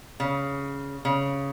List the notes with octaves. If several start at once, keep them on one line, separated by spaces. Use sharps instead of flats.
C#3
C#3